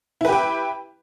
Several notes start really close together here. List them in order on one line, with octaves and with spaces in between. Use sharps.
E4 B4 G4 G5